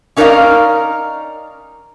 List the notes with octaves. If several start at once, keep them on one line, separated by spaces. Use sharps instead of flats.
C#4 D#4 A#4 B4 D5 F5